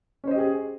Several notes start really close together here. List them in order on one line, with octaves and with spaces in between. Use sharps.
C#4 C5 D#5 G4 G#4